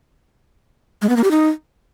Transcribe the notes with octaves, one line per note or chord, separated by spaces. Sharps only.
G#3
B3
A#3
G4
D#4